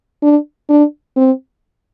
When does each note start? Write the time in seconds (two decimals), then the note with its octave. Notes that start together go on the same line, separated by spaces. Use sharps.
0.23 D4
0.69 D4
1.17 C4